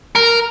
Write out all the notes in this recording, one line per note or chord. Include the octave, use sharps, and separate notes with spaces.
A#4